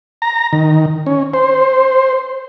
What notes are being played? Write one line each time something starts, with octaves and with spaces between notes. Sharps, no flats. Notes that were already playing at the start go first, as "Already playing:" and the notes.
A#5
D#3
C#4
C5